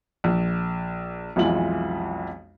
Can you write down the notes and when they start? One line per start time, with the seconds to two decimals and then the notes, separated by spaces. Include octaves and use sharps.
0.24 A#1
1.36 B1 F2 E3 G#3 F4 F#7